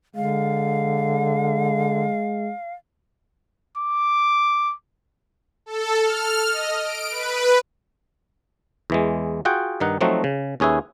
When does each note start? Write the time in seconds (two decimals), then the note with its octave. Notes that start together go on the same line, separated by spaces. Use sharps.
0.15 D3 G#3 F5
3.77 D6
5.66 A4
6.02 F6
6.51 D#5
6.81 D7
7.10 B4
8.90 E2 E3 G#3
9.45 F4 F#4 G#4 F#5 G5
9.80 G2 D#3 D#4 F#5
10.01 F3 F#3 A3 C4 D#4 F#4
10.24 C#3
10.60 D#2 C#4 G#4 B4 E5